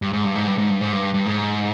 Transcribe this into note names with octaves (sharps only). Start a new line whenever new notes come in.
G2
G#2
G2
G#2
G2
G#2
G2
G#2
G2
G2
G#2